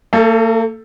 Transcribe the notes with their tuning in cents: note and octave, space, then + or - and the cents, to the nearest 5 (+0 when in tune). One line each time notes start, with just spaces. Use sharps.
A#3 -45 A4 +0